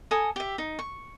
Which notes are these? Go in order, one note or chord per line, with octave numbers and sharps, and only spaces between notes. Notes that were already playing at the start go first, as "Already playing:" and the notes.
A4 G#5 A#5 D#6
G4 E5
D#4
C#6